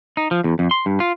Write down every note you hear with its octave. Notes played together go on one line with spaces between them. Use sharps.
D#4
F3
E2
F2
C6
G2
F4